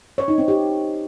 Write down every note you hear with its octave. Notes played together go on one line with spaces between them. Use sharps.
C#5
D#4
C4
G4